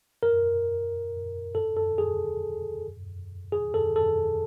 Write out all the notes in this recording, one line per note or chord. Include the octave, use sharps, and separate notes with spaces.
A#4
A4
A4
G#4
G#4
A4
A4